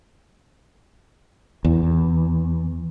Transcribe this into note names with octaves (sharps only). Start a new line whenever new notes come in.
E2